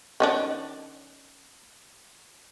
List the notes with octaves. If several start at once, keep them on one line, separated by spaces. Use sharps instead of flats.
D#3 C#4 D4